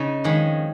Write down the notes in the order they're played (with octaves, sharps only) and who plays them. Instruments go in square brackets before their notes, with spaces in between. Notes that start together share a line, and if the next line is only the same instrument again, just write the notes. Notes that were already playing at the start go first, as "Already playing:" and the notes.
Already playing: [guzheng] C#3 D#4
F2 D#3 G#3 C#4